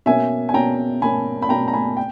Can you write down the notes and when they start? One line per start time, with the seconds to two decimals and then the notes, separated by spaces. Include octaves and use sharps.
0.06 B2 A#3 C#4 E5 G#5
0.49 G#5
0.54 B2 A#3 C#4 G5 A#5
1.01 B2 A#3 C#4 G#5 B5
1.42 B5
1.49 B2 A#3 C#4 G5 A#5
1.68 A#5
1.73 G#5 B5
1.97 G5